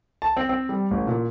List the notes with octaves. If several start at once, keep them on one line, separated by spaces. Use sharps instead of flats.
A5
C4
C4
G3
A1
A#2